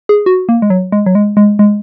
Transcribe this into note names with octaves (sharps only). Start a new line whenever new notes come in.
G#4
F#4
A#3
G#3
F#3
G#3
F#3
G#3
G#3
G#3